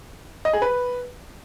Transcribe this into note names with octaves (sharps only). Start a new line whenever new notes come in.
D#5
G#4
B4